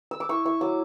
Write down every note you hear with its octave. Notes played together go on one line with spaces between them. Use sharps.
E6
D6
E4 C#6
E4 C#6
F#3 D6